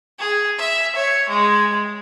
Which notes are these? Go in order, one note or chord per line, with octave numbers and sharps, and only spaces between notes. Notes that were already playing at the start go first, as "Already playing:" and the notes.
G#4
E5
C#5
G#3